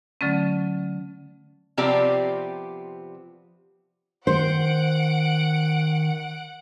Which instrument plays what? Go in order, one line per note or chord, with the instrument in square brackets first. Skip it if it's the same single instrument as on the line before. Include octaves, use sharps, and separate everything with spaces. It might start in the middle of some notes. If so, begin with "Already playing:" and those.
[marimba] D3 F#3 A3 C#4
[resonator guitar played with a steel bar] C3 F3 B3 C4 G4 D5
[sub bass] D#3 [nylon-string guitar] C5 [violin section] F#5 D7